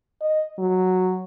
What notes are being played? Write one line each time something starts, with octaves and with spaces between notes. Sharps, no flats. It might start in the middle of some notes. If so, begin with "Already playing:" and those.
D#5
F#3